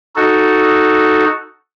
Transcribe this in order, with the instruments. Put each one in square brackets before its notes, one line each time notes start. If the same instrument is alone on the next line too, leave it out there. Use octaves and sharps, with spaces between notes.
[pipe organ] D#4 F#4 A4